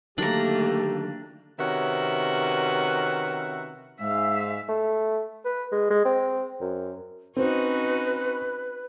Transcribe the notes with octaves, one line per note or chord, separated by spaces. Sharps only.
D3 D#3 F#3 A3 A#3 D4 G4 A#5
C3 D#3 C#4 F#4 B4 E5
G#2 G#3 E5 F5
A3
B4
G#3
G#3
C4
F#2
C4 C#4 D#4 F#4 B4